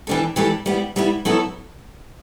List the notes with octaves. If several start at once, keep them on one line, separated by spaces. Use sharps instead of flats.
E3 G3 D4 A4
E3 G3 D4 A4
G3 B3 E4
G3 B3 E4
F#3 B3 E4 A4